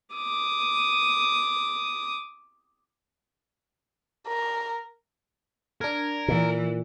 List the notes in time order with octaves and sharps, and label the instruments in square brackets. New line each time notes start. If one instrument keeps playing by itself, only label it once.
[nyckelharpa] D6 D#6
[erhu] A#4
[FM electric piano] D4 G#6 [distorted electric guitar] A#4
[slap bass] A#2 [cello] E3